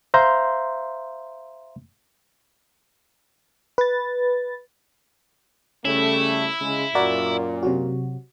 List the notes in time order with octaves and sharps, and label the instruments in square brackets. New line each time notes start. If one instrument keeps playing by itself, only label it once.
[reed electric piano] C5 E5 F5 A#5 C6 G6
[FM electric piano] B4 A6
[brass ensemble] C#3 G3 A3 [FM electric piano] C#4 [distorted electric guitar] E4
[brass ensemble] C#3 G#3
[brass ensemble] F#2 A#2 [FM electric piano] F#4 A#4 D5
[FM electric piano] C3 F#3 F#4